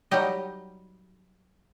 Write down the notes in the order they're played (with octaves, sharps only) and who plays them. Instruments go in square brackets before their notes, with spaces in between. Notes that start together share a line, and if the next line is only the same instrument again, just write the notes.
[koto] F#3 G3 D#4 G4 D#5